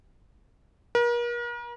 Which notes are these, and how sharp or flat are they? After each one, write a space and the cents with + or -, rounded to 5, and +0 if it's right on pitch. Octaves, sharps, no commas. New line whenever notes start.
A#4 +40